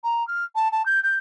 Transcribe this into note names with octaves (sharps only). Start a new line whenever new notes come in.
A#5
F6
A5
A5
G6
G6